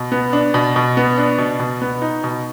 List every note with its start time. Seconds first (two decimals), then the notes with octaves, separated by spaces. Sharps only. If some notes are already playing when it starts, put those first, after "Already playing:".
Already playing: B2
0.12 B3
0.33 D4
0.54 B2
0.76 B2
0.97 B3
1.18 D4
1.38 B2
1.60 B2
1.82 B3
2.02 D#4
2.24 B2